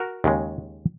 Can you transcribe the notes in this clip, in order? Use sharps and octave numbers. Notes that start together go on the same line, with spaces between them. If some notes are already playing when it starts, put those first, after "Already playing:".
Already playing: F#4 A#4
D#2 C#3 G#3